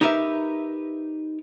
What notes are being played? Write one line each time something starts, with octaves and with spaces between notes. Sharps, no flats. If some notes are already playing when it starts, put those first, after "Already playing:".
D#4 G4 A#4 B4 E5